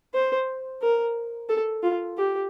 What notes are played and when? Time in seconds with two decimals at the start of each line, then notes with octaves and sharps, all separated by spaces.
0.14 C5
0.81 A#4
1.49 A4
1.83 F4
2.17 G4